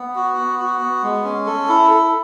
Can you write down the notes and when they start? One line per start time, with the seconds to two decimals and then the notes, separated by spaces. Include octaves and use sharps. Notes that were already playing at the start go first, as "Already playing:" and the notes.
Already playing: B3
0.16 F#4
0.37 B3
0.59 F#4
0.81 B3
1.03 G#3
1.24 C#4
1.46 A4
1.68 E4
1.90 A4